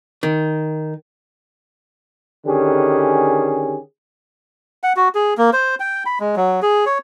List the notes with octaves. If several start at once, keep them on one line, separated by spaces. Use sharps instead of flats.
D#3
D3 D#3 C#4 G4 G#4
F#5
F#4
G#4
A#3
C5
G5
B5
G#3
F#3
G#4
C#5